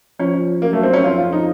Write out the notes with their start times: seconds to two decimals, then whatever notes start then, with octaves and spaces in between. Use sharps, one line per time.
0.19 F3 C#4
0.62 F#2 A#3
0.73 A3
0.83 C4
0.93 C#4
1.04 F2 F4
1.19 F4
1.33 D#4